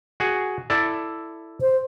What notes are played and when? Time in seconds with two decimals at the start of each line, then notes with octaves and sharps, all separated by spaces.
0.20 F#4 G#4
0.70 E4 A4 D5
1.61 C5